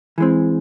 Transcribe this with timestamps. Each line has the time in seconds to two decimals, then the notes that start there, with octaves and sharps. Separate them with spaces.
0.18 E3 G#3 C4